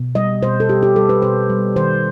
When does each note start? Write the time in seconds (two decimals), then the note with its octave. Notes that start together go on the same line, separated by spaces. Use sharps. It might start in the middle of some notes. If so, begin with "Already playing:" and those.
Already playing: B2
0.15 G3 D#5
0.42 B2 C5
0.60 A4
0.69 G3 G4
0.83 G4
0.96 G3 A4
1.09 B4
1.22 B2 C5
1.50 G3
1.76 D#3 C5